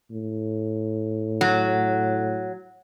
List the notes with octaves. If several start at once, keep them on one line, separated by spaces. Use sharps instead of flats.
A2
F#3